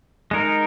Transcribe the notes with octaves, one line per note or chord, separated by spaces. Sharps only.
G#3 D#4 A#4